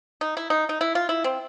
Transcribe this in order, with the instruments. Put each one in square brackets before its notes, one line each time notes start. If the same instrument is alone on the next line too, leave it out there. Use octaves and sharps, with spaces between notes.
[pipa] D#4
E4
D#4
D#4
E4
F4
E4
C4